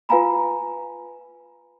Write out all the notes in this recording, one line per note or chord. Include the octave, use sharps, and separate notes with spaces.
F4 B4 F5 G#5 A#5 B5